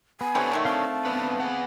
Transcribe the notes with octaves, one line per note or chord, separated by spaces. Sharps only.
B3 G#5
E3 G3 C4 D4 A4 C#5
D3 D#3 A3
C4 F5 A5
B3 D4 B4
B3 G#4 F#5